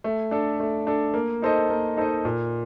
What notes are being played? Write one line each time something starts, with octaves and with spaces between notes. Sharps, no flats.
A3
D4 A4
A3
D4 A4
A#3
D#4 A4 C5 D#5
A#3
D#4 A4 C5 D#5
A#2